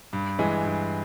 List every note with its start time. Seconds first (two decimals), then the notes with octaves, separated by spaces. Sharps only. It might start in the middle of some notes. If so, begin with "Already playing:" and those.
0.13 G2
0.39 E3 G#3
0.65 G2